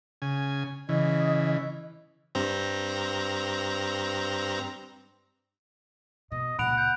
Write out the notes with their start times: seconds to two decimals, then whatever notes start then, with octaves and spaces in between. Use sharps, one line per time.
0.22 C#3 G#5
0.89 C#3 E3 D#5
2.35 G2 C4 A#5
6.32 B2 D#5
6.59 C#2 A#2 F#5 B5 D7 F7
6.78 F#5 G6